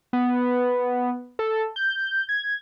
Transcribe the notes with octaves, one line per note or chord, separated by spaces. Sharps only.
B3
A4
G6
G#6